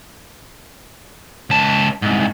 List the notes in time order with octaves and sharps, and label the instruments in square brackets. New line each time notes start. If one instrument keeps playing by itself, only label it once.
[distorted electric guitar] C#2 A5
C2 G#2